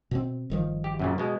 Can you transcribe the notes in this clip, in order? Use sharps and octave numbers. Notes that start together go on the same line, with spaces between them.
B2 C4
G1 D#3 F3
G4
F#2 A#2 C#3
B2 G#3